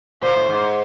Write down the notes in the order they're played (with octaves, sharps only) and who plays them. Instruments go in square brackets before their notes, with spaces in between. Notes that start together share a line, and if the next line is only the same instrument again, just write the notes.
[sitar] A#2 [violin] C5
[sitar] A2
G#2